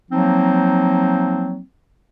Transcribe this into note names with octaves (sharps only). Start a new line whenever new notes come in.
F3 F#3 A#3 C4 D#4